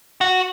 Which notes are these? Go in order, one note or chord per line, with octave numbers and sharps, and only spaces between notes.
F#4